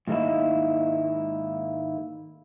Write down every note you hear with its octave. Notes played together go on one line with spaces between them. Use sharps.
G#2 D#3 G#3 A#3 E4